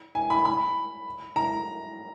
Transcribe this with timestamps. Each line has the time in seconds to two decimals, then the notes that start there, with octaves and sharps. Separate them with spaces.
0.15 G#5
0.30 B5
0.45 B5
1.36 A#5